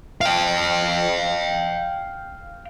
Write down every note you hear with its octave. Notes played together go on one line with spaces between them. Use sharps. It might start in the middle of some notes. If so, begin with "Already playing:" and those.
F5 G5